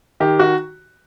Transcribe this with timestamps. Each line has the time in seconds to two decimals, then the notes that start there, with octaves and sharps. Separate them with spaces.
0.20 D#3 G4
0.39 F#4